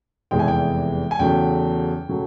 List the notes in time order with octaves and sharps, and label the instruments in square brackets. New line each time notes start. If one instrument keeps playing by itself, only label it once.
[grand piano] F1 E2 C3 E3 G#3 G5
G#5
G5
G#5
E2 C#3 F#3 A3 G5
C#3 F#3 A3